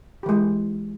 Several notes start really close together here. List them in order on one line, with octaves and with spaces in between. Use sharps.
G4 E3 G#3